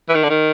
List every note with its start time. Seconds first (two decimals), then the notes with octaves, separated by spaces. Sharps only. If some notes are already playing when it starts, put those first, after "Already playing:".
0.09 E3
0.15 D#3
0.23 D3
0.29 D#3